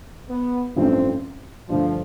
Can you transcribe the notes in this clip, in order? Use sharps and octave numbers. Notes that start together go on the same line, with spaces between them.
B3
A1 G2 F3 A3 C4
G2 D3 F3 A3